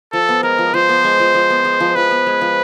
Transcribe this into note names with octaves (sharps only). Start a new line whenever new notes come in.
F3 A4
B3
G#3 A#4
F3
F3 C5
B3
G#3
F3
F3
B3
G#3
F3
F3 B4
B3
G#3
F3